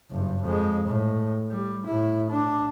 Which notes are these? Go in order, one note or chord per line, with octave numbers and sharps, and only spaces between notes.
F#1 G2
F2 G#3
A2
G3
A2 E4
D4